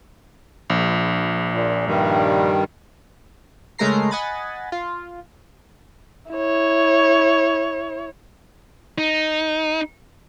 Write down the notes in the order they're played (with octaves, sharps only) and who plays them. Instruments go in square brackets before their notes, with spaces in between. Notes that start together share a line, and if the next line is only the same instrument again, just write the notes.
[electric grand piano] A#1
[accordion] A#2
G2 D#3 G3
[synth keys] C#3 G#3 A3 A#4 A#5 C7
D#5 F#5 G#5 B5 A6
F4
[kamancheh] E4 C#5
[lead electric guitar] D#4